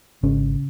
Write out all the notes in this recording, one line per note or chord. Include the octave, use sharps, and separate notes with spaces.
G#1 C#3 C#4